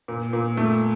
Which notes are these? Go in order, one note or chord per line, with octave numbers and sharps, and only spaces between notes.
A#2
A#2
A3